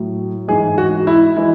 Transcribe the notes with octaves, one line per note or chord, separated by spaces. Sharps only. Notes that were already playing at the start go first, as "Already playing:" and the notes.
Already playing: A2 F#3
G#2 E3 G#3 G#4
F#4
E4
E3 G#3 E4